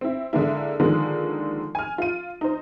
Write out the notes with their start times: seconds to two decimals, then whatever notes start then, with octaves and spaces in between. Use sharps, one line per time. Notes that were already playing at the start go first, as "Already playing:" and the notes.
0.01 C4 E4
0.33 D3 G#3 A#3 E4
0.80 D3 D#3 F3 G#3 A#3
1.75 G#5 F6
1.98 F4 D#7
2.41 D#4 C5